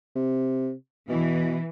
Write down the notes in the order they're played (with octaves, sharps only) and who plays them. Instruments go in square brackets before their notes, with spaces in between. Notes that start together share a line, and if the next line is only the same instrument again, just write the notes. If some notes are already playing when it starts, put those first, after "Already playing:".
[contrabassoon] C3
[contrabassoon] B2 [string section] E3